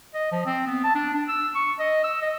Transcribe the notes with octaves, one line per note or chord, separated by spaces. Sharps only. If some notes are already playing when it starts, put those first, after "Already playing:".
D#5
F3
C4
B3
A5
D4
D4
E6
C#6
D#5
E6
D#5